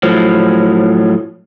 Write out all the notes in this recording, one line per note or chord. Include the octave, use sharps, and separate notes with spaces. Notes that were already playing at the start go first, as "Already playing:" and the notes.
A2 F3 F#3